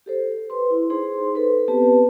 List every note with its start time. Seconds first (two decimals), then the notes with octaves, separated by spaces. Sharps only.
0.06 G4 A4 C5
0.50 B4 C6
0.70 E4
0.90 D#4 G#4 C5 C6
1.35 A4 B4
1.68 B3 C4 G4 B4 A5